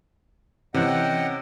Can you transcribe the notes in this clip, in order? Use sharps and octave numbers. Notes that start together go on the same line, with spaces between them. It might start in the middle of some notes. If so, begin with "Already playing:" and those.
C3 E3 C#4 D#5 F#5 G5 F#6